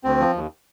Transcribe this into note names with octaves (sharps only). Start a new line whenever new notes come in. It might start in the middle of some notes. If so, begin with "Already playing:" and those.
D2 C4
F3
D#2